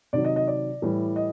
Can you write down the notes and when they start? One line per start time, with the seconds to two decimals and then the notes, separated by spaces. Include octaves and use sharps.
0.13 C3 D#3 F#3 D5
0.25 D#5
0.36 D#5
0.48 D5
0.82 A2 E3 G3
1.16 D#5